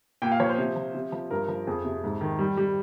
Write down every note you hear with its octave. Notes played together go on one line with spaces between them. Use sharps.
A#2 G5
F5
F3 C#5
C5
C3
F3
C3
F3
G2 A#4
F3
F2 G#4
C3
G#2
D#3
G3
G3